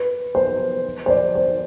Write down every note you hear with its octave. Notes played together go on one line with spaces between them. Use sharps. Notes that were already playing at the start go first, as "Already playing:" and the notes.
Already playing: B4
C5
C5
D5
C5